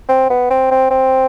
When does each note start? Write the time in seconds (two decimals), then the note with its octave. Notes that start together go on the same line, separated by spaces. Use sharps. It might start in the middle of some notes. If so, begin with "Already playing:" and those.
0.08 C4
0.30 B3
0.50 C4
0.71 C4
0.91 C4